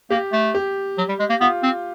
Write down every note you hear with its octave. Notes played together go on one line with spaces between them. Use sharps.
A#3 G4
A3
G4
F#3
G3
G#3
A#3
B3 F4
C4